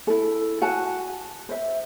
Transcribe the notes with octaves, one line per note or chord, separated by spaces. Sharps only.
E4 A4
F#4 F#5 G#5 A5
C5 E5